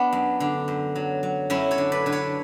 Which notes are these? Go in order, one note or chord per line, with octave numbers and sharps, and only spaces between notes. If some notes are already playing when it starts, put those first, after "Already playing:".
Already playing: B3 D4
F#2
D3
F#2
F#3
F#3
F#2 C#4 E4
A4 C#5
D3
B4 D5
D3 B4
A4 C#5